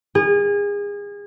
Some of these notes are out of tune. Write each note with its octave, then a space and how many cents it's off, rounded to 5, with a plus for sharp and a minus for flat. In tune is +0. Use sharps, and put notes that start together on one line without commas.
G#4 -30